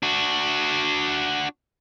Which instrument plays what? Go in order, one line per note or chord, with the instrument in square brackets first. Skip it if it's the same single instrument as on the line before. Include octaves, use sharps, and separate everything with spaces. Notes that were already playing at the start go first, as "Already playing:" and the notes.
[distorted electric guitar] D4 F#4